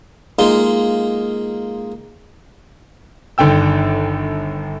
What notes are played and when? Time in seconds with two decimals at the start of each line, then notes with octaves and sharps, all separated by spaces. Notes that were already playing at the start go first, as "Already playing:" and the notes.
0.39 G#3 A#3 D#4 F4
3.38 G1 D3 D#3 G5 E6